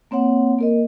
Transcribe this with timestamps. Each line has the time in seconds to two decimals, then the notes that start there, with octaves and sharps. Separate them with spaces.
0.11 A#3 C4 C#5 F#5
0.59 A#3 A#4 D#5